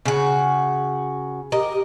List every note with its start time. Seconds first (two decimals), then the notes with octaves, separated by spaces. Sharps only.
0.05 C#3 F#4
1.52 G4 A#4 D#5